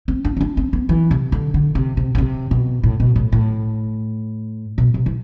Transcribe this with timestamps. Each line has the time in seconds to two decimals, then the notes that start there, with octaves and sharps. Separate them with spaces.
0.08 C4
0.25 D4
0.37 C4
0.41 D4
0.57 C4
0.73 B3
0.89 E3
1.11 C3
1.32 D3
1.54 D3
1.75 C3
1.97 C3
2.15 D3
2.18 C3
2.51 B2
2.83 A2
3.00 B2
3.16 A2
3.32 A2
4.78 B2
4.94 C3
5.06 E3